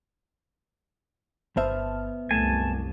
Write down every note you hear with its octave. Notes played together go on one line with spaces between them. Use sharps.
G1 B3 C5 E5 A5 F6
C2 F#2 A3 G#5 A5